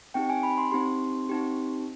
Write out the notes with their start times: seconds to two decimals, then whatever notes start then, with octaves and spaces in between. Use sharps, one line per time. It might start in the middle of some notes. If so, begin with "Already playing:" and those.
0.14 C4 D#4 G4 G5
0.30 G#5
0.43 B5
0.58 C6
0.71 C4 D#4 G4 C6
1.29 C4 D#4 G4